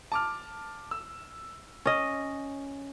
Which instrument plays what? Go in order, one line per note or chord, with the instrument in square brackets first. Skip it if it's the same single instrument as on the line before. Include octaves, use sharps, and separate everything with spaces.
[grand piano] A5 D6 F6
E6
[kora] C#4 D#5